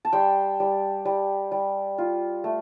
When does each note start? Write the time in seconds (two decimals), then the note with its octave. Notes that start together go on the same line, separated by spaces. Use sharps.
0.05 A5
0.12 G3 G5 C6
0.60 G3
1.05 G3
1.52 G3
1.98 F4
2.44 A3